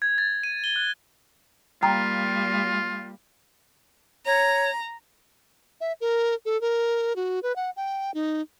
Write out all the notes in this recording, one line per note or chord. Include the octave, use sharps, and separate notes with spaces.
G#6
A6
D#7
G7
F#6
G3 A#3 F4 G5 A#5
C#5 A#5
E5
A#4
A4
A#4
F#4
B4
F#5
G5
D#4